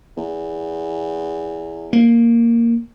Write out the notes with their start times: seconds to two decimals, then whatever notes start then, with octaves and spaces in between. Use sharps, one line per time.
0.17 E2
1.93 A#3